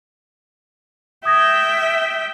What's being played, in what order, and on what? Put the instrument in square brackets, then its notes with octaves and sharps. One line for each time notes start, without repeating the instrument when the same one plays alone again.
[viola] E5 G5 [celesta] D#6 G#6 A#6